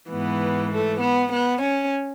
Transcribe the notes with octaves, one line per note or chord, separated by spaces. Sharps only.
G#2 E3 B3
A3
B3
B3
C#4